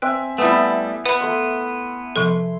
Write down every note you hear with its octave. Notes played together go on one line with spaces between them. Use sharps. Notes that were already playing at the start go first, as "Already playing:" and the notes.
C4 E5 G#5 F#6
G3 A3 B3 E4
B3 B4 B5
A3 C6
C3 F3 A4 C6